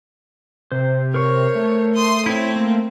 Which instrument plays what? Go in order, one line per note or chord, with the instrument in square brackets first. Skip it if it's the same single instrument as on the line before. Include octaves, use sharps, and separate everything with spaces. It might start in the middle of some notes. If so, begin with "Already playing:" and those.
[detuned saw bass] C3 [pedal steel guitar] C5
[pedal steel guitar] A#4 C5 C#6 [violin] C#5
[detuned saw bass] A3
[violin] C6 D#6
[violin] C4 [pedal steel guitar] E4 C#5
[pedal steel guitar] A#3